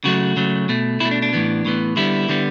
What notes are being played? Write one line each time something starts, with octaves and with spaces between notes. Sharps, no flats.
C#3 F#3 A3 F#4
C#3 F#3 A3
B2 A3
B2 A3 E4
D4
D4
A2 E3 B3
A2 E3 B3
D3 G3 B3 E4
D3 G3 B3